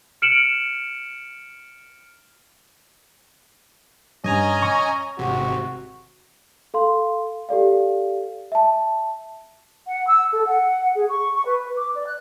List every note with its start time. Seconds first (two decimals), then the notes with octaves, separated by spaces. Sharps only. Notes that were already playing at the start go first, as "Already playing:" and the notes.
0.22 F6 C#7 D7 E7 F#7
4.24 G2 C#4 D#5 G#5 A#5
4.62 C#6
5.18 G#1 C3 F#4
6.74 A4 F5 C6
7.49 G4 A4 D5 F5
8.52 E5 A5
9.86 F#5
10.07 E6
10.33 A4
10.46 F#5
10.95 G#4
11.09 C#6
11.34 C#6
11.46 B4
11.78 D6
11.95 D5
12.06 F#6